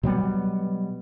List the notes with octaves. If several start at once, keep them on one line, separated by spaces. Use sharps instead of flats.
B2 F#3 G3 B3